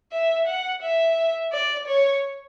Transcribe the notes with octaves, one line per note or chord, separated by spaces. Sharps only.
E5
F#5
E5
D5
C#5